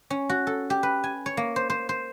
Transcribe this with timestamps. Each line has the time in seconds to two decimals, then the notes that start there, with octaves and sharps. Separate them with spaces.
0.10 C#4
0.29 F#4
0.47 A4
0.70 G4
0.83 B4
1.04 G#5
1.26 C#5
1.37 A#3
1.56 C5
1.70 C5
1.89 C5